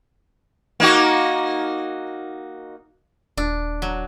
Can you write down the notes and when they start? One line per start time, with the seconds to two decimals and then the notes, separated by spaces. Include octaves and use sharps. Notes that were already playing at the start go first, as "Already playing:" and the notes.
0.80 A#3 D#4 F#4
3.37 D#1 D4
3.82 F#3